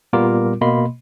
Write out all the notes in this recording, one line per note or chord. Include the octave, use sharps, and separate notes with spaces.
A#2 G3 B3 F4 A#4 D6
B2 A#3 D#5 B5 C6